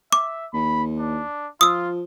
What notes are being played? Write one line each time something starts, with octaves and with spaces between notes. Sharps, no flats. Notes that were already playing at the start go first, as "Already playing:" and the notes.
E5 D6
D#2 B5
D4
F3 F4 D#6 E6